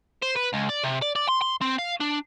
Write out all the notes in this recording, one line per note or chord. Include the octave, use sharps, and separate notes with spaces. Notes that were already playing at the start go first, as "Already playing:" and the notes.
C5
B4
C#2
D5
C3
D5
D5
C6
C6
C4
F5
D4